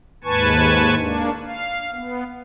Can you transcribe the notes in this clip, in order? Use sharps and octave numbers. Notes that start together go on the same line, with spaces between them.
D#2 G#2 B4 G#5 A5 C#6
A#3 D4
F5
B3